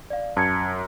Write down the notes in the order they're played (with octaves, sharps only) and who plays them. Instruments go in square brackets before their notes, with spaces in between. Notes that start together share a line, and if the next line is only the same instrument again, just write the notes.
[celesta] D5 F5
[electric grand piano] F#2 [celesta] A5 G#6 C#7